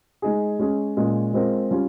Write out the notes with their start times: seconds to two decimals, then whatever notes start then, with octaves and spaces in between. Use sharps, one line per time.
0.22 G#3 D#4 G#4
0.59 G#3 C#4 G#4
0.97 A#2 G#3 C#4
1.33 G#3 C4 F4 A#4
1.71 G3 C#4 F4